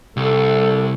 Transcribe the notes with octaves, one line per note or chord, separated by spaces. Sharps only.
C2 A4